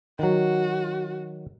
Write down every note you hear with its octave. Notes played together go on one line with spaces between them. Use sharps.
D#3 F#3 F#4